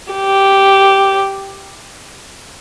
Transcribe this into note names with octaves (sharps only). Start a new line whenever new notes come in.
G4